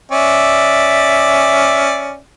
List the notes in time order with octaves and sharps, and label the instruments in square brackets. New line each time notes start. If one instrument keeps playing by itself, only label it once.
[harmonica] C#4 D5 E5